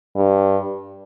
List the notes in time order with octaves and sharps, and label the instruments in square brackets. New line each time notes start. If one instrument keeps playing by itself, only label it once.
[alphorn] G2